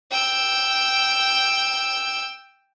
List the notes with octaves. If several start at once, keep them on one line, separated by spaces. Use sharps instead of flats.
G5 E6